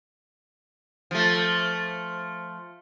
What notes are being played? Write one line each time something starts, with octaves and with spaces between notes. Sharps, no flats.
F3 A3